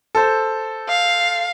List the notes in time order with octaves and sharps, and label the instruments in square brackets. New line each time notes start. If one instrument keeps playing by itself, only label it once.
[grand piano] A4 C5
[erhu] F5